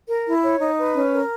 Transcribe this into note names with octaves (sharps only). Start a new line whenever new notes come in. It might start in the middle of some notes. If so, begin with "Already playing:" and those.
A#4
E4
C#5
D#4
B4
C#4
A#4